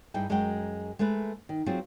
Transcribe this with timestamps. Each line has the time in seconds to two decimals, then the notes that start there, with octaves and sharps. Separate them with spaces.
0.14 G2 D#4 E4 G#4 G5
0.29 F#2 G#3 F#4 A#4 F5 G5
0.99 G#3 A3 A#4 B4
1.49 D#3
1.66 F#3 C4 F4 G#4